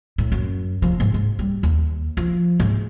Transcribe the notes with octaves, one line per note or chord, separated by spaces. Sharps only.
A2
F#2
F3
G#2
G#2
G3
D#2
F3
G#2